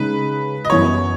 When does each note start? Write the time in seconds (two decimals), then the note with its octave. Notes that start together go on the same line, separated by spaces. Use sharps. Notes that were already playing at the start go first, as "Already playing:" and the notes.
Already playing: C#3 G#3 D#4 B4
0.65 D#5
0.70 F#2 E3 B3 C#5